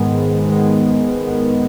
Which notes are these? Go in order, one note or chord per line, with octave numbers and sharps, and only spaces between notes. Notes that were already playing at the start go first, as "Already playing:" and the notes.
Already playing: G#2 D#3 G#3 B3
G#2
D#3 G#3 B3
G#2
D#3 G#3 B3